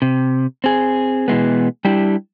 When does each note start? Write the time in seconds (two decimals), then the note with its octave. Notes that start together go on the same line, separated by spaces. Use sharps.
0.02 C3
0.64 C4 G#4
1.28 B2 E3 G#3 B3
1.85 G3 D4 E4 G4